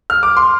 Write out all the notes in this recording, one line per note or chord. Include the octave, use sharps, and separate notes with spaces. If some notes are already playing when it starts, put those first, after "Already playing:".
F6
D6
C6